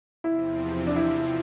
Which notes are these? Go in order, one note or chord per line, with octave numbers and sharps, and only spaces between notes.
E2 C3 F3 C4 E4
D4
E4